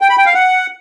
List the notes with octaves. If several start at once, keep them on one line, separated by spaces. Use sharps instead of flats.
G5
B5
G5
F5
F#5